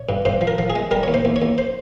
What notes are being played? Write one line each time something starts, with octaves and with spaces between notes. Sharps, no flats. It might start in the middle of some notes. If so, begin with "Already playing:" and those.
Already playing: C#5
G2
G2 C5
F3
A#4
F3
G#4
G#3
G3 A#4
D#2 C#5
C5
D#2
C#5
D#2
C5